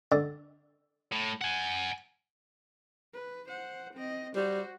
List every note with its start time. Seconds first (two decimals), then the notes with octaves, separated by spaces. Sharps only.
0.12 D3
1.12 A2
1.42 F#5 G#5
3.14 B4
3.48 C5 F#5
3.94 C4 D#5
4.36 G3 F#4 C5